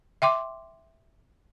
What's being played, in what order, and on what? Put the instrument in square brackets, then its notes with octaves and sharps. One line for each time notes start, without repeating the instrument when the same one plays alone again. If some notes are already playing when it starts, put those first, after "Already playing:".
[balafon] E5 G5 C6 D6